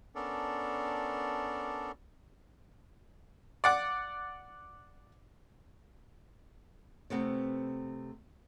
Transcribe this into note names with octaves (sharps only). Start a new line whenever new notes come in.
B3 C#4 D4 A4 A#4 D5
D5 F#5 D6
C3 A3 B3 C4